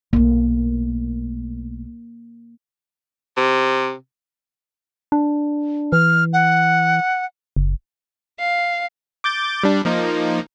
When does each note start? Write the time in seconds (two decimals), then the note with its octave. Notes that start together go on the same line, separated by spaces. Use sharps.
0.13 B1 A3 A#3
3.37 C3
5.12 D4
5.92 E3 F6
6.33 F#5
7.56 F#1
8.38 F5
9.24 D6 G6 A6
9.63 G3 D4
9.85 F3 A#3 D#4